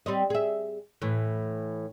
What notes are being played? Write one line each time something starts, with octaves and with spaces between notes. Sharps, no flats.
G3 C4 D#5
G#4 E5
A2 E3